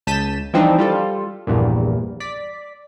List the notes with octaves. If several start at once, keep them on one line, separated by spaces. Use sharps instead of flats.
C#2 A5 G6 B6 D#7 E7
E3 F3 G3 C4 D4 D#4
G3 F4 A4
A#1 E2 G2 A#2
D5 B6